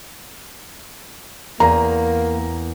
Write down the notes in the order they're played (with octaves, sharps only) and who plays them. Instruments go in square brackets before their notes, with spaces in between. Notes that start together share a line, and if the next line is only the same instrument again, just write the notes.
[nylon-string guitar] E2 [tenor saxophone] A#3 [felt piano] A#5